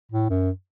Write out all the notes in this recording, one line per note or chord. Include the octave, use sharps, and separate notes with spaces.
A2
F#2